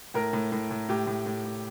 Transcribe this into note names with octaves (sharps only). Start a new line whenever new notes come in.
A2 A#4
A2
A2
A2
A2 G4
A2
A2
A2